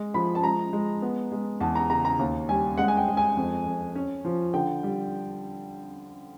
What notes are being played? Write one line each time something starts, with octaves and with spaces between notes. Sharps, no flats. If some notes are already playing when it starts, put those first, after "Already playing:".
Already playing: G#3
F3 B5
A5
G#3 A#5
G#3
B3
G#3
E2 A5
A#5
C#3 A#5
A#5
D#2
G3 G#5
G#3 F#5
G#5
G5
G#3
G#5
F2
F2
C#4
F3
D3 G5
G3